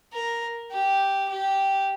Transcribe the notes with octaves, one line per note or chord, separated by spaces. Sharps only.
A#4
G4
G4